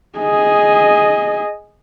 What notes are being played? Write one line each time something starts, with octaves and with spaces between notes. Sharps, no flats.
G#4 D#5